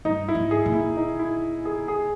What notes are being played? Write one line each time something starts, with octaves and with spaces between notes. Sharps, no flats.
G2 D#4
E4
G#2
G#4
A#2
E4
D#4
E4
G#4
G#4